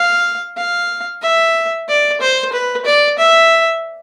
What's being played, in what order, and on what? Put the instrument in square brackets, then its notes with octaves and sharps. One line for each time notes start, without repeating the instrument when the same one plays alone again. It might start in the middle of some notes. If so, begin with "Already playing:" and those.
Already playing: [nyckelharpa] F5
F5
E5
D5
C5
B4
D5
E5